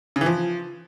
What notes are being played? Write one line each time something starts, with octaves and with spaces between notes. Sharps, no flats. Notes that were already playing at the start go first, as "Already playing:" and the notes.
C#3
E3
F3